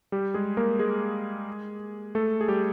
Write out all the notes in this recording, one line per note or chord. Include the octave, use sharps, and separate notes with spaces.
G3 G4
G#3 G#4
A#3 A#4
G#3 G#4
A3 A4
G#4
G3 G4